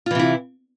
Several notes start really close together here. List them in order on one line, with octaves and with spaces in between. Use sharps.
F4 E3 C3 E4